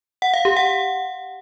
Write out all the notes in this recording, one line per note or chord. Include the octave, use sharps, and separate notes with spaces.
F#5
F5
G4
F#5